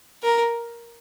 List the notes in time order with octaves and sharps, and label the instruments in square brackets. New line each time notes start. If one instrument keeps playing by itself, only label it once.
[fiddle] A#4